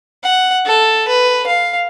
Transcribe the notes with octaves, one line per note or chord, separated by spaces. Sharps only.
F#5
A4
B4
F5